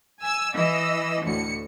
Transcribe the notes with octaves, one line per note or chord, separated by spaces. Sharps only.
G#5 E6
E3 D#5 E6
D2 A2 C#7